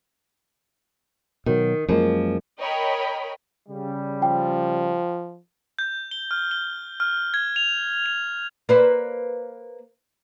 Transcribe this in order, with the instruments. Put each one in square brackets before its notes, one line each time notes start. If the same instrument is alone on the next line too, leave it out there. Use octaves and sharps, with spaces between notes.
[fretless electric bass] B2 F#3 [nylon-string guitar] D#3
[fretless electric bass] F#2 G#3 [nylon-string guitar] F3 A#3
[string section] A#4 C#5 D#5 G5 B5
[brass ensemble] C#3 G3
[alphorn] F3 [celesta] G5
[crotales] G6
G7
F6
G7
F6
G#6
F7
F7
[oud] A#3 B4 C5